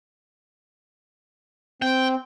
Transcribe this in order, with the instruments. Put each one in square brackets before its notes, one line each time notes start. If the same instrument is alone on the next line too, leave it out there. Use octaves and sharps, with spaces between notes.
[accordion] C4 [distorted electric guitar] G5